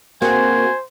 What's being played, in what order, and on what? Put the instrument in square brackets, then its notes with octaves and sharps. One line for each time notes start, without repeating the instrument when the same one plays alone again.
[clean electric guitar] A#3 G#4 [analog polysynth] C4 F#4 [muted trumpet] C5 [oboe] G#5